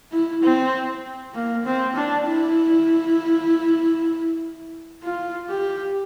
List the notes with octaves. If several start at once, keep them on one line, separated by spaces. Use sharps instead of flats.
E4
C4
A#3
C4
D4
E4
F4
G4